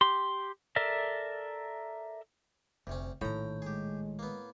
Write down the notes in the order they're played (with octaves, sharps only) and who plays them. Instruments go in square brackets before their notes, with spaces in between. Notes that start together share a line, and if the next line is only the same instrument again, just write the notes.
[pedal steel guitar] G4 C6
A4 A#4 D5 E5
[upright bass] F1 [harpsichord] D2 C3 C#4
[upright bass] A#1 D#3 [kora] A2 [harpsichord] G5 A#5
[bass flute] G#3 [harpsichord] G4 G#4
[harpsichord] A#3 B3